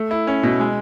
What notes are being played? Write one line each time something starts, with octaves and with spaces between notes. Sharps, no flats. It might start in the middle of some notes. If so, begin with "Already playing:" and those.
Already playing: A3
E4
C#4
B2
G#3